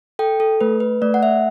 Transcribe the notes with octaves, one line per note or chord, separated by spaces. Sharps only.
A4 G5
A4
A3 B4
B4
A3 D5
F#5
E5